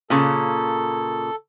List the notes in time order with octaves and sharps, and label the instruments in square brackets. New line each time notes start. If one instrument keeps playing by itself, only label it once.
[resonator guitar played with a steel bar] A#2 C#3 [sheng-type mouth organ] A4